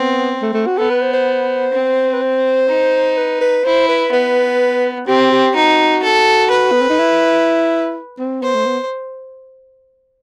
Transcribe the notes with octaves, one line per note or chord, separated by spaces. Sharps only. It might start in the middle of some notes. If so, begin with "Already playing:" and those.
Already playing: B3 C4
A3
A3
F#4
B3 A4
B4
C5
C5
C4
B4
C5
D#4
B4
B4
E4 C5
B4
B3 B4
C4 G4
G4
D#4 F#4
A4
B4
B3
C4
D#4
E4
C4
B3 C5
A3
B3